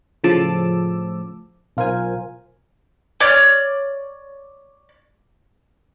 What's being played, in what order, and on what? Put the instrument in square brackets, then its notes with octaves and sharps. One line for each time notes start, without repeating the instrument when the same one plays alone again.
[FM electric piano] A2 C#3 F3 A5 D6 E6
B1 F4 A#4 C5 G#5
[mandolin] C#5 D5 F6